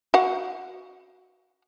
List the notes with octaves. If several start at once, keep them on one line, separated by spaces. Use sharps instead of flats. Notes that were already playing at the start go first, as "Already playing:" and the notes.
F#4 F5 F#5